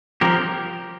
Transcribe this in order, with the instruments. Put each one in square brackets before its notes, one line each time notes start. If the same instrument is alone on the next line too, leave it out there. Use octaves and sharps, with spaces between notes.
[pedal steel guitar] F3 G4 A#4